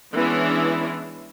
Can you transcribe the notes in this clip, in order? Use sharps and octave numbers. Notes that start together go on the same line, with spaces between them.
E3 G#3 B3 C#4 D4 E4